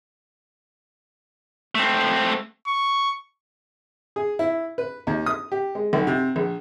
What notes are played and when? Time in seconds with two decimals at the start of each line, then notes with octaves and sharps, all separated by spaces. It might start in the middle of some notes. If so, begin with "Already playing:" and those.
1.75 A3 C4
2.67 C#6
4.16 G#4
4.39 E4
4.78 B4
5.07 D#2
5.26 D#6
5.52 G4
5.75 G#3
5.93 B1
6.07 C3
6.36 A#1